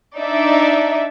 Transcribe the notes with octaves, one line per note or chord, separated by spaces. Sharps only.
D4 D#4 D5 E5